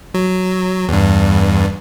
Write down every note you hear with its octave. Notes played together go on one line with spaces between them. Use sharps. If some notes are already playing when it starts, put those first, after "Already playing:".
F#3
E2 G2